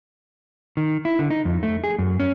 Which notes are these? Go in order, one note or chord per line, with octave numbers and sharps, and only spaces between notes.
D#3
E4
D3
D#4
F2
A3
G#4
F#2
C#4